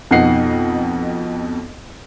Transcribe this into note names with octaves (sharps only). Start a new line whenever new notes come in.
F2 B2 D#4 F#5 C7